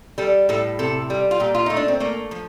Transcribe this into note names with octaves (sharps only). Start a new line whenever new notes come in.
G3 A4
A2 A4
C3 A4
G3
F4
A#2 G4
F4
A3 D#4
D4
C4
A3 A#3
F3